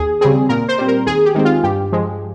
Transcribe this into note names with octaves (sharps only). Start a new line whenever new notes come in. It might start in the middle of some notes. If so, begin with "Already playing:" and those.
Already playing: D#2 G#4
C#3 G3 C4 G#4
A#2 A#4
C5
G3 C4
A#4
D#2 G#4
G4
D#3 G#3 C4
F4
G2 G4
F3 G#3